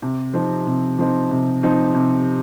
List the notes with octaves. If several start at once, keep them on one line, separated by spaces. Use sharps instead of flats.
C3
F3 C4 D#4
C3
F3 C4 D#4
C3
F3 C4 D#4
C3